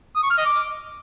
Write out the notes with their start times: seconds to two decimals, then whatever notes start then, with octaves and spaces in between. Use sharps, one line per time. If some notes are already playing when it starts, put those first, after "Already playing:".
0.16 D#6
0.23 C#6
0.31 F6
0.38 D#5
0.45 D6